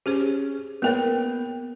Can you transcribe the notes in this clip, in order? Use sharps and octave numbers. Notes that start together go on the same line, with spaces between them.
C#4 G4 G#4 C5
A#3 B3 A#4 C#5 G5